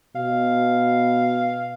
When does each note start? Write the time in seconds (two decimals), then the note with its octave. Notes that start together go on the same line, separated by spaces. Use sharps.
0.16 B2 F5